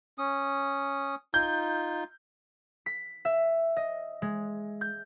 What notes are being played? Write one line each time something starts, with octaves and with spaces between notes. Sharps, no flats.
C#4 D#6
D#4 F4 G6
B6
E5
D#5
G#3
G6